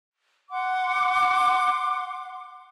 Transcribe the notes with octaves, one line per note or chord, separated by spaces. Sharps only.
F#5 C6 D6